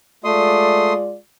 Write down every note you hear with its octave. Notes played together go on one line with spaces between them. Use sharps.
G#3 A3 F4 D5 C6 D#6